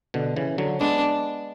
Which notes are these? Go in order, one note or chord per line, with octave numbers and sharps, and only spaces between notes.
B2 D3
C#3 E3
D3 F#3
G#3 B3 D4